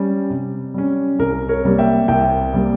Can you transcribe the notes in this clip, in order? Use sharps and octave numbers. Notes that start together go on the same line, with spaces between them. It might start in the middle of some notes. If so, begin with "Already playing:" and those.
Already playing: G3 C#4
C3
G3 C#4
C2 A#4
A#4 C#5
C3 G3 A#3
E5 G5
C2 E5 G5
C3 G3 A#3